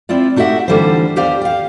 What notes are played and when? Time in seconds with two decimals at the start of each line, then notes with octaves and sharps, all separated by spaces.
0.09 C4 E4 F4 D5
0.36 A3 D#4 F#4 G4 E5 F#5
0.68 D3 E3 G3 F4 A4 C5
1.16 D#2 B3 G4 C5 D5 F5
1.41 F5 G5